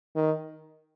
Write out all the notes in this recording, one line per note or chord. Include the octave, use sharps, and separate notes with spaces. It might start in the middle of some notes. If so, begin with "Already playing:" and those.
D#3